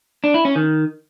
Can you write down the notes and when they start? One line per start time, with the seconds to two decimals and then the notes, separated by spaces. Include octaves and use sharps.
0.24 D4
0.34 E4
0.45 C#4
0.56 D#3